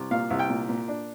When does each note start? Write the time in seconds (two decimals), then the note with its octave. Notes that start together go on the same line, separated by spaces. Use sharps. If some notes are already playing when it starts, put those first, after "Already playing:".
Already playing: C2
0.11 A#2 F5
0.30 C2
0.39 G5
0.50 A#2
0.69 A#2
0.88 D4